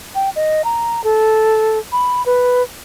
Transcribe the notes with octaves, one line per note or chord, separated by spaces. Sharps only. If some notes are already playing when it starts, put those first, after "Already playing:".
G5
D#5
A#5
A4
B5
B4